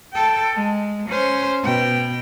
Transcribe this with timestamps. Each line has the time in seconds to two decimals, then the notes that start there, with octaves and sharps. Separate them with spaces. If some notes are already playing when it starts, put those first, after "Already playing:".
0.13 A4 G5
0.54 G#3
1.09 C#4 C5
1.63 B2 G5